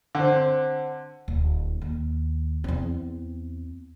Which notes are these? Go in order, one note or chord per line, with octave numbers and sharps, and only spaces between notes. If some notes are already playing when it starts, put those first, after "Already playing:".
D3 C4
D1
D#2
E2 C4